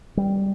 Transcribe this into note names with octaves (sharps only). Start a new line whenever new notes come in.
G3